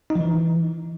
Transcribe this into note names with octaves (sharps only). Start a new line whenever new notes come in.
D#4
F3
E3